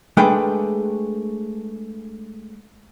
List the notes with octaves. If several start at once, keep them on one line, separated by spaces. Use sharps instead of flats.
G#3 A3 D4 G#4 B4 G5